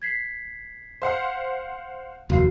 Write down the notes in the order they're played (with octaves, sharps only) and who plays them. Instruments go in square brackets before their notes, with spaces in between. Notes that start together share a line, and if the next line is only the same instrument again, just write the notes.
[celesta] G#6 B6 C7
[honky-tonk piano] C5 F5 F#5
[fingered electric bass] F1 D#2 [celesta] F#4 F5 C7